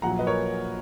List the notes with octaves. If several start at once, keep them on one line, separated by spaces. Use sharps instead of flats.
A#1 A#2 F#3 F#5 A#5
B4 D#5
A#4 C#5